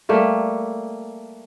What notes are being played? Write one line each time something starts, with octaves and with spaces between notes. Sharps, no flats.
G3 A3 A#3